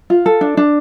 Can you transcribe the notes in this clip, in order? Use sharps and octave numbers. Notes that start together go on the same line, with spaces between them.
F4
A4
D4
D4